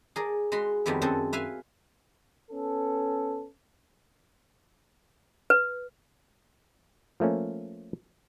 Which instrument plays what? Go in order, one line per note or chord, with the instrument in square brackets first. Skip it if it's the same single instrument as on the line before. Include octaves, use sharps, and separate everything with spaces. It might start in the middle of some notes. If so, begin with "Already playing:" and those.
[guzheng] G#4 A#4 D5
G#3 F#4 B5 C6
F2 D#3 G3 B3 E4
F#2 C4 G#4 A4 F#5
B4 E5 F5 G#5
[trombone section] B3 C#4 A4
[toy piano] B4
[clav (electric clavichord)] F3 A3 A#3 C#4